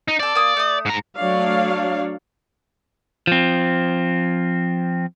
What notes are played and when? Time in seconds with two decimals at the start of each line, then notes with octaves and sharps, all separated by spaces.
0.08 D#4
0.20 C4 A4 D5
0.35 A#3 D#6
0.57 A3 D#6
0.86 G#2 A#5
1.17 F#3 A3 D4 C#5 D5 F5
3.27 F3 C4